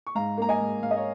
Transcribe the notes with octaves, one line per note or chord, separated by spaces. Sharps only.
C#6
G#2 F5 A#5
A#3 A#5
D#5 G#5
G#2
G#2 F5
D#5
C#5